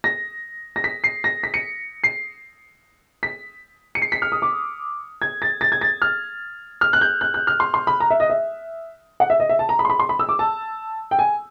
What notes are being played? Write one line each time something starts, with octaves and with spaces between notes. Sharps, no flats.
A#6
A#6
B6
C7
A#6
B6
C#7
C7
B6
C#7
C7
B6
F6
D#6
D6
G#6
A6
A6
G#6
A6
F6
F6
F#6
G6
F#6
F#6
F6
C6
C6
B5
A#5
E5
D#5
E5
F#5
E5
D#5
E5
A5
A#5
B5
C6
B5
C6
B5
E6
D6
A5
G5
G#5